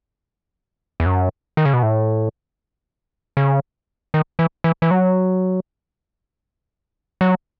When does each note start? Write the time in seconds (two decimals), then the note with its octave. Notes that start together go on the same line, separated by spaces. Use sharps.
1.00 E2
1.06 F#2
1.57 D#3
1.65 C#3
1.74 B2
1.83 A2
3.37 C#3
4.14 D#3
4.39 E3
4.64 E3
4.82 E3
4.91 F#3
7.21 F#3